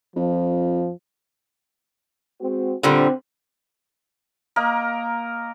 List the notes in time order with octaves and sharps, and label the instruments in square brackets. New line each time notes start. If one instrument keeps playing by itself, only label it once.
[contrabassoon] F2 [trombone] F3
[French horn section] G#3 C4 F#4
[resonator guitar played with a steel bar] A#2 D3 G3 [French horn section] C4
[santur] A#3 A#4 D#5